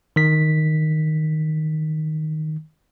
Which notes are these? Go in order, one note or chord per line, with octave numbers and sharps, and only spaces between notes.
D#3 B6